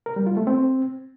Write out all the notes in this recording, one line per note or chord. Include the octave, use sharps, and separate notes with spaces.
A#4
G3
F4
A3
C4